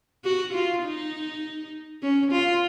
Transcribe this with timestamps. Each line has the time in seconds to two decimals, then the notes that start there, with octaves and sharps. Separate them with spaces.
0.24 F#4
0.54 F4
0.83 D#4
2.03 C#4
2.32 F4